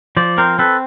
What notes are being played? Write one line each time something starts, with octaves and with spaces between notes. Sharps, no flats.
F3 C5 D5
C4 A#4 C5
C4 A4 B4